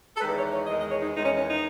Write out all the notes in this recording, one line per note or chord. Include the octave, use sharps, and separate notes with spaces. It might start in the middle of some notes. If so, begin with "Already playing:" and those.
A4
E2 D#3 G#3 B4
C#5
C#5
E2 D#3 G#3 D#5
D#5
C#5
D#4
E2 D#3 G#3 D#4
C#4
C#4
D#4